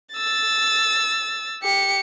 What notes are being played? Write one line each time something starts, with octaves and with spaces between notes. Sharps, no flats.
E6 A6
G4 C#7